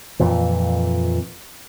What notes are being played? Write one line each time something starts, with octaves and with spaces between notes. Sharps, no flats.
F2 A#2 E3